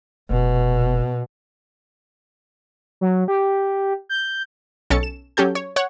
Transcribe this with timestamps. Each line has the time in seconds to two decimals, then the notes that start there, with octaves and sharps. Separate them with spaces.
0.30 F1 B2
3.01 F#3
3.28 G4
4.09 G6
4.90 B1 C#4 A4 A6 C#7
5.03 E7
5.37 F#3 C#4 G4 A4 G6
5.55 C#5
5.76 C#5 F#5 C#6